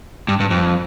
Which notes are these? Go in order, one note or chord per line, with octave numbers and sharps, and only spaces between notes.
G2
G2
F2